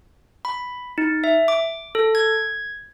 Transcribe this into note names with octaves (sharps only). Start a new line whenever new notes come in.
B5
D#4
E5
D6
A4
G#6